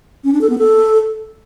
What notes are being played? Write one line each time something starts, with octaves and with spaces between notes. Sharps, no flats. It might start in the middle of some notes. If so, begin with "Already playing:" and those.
C#4
D4
A4
B3
A4